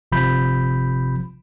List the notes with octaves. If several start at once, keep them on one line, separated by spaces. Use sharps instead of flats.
G1 C3 F3 B5 G6